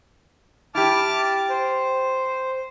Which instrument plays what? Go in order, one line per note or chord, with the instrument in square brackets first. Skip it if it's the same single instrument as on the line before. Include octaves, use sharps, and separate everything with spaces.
[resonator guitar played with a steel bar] E4 G4 [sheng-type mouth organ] A5 D6 F6
[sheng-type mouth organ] C5